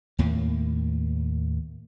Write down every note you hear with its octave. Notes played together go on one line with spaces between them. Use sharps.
D#2 A2 A#3